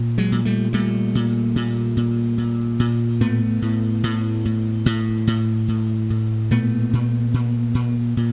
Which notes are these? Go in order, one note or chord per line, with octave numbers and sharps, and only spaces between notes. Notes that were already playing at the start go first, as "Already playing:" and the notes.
Already playing: A#2
F#3 G#3
A#2
G3 A3
A#2 G3 A3
A#2
A#2
A#2
A#2
A#2
A2 A3 B3
A2
A2
A2
A2
A2
A2
A2
A#2 A3 B3
A#2
A#2
A#2
A#2